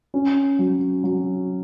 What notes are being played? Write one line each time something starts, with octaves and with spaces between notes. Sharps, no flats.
C#4
F#3
F#3